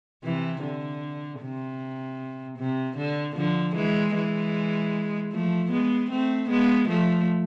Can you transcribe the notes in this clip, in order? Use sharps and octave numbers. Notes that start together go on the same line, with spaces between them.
C3 E3
D3
C3
C3
D3
D3 F3
E3 G#3
E3 G#3
F3 A3
G#3 B3
A3 C4
G#3 B3
F3 A3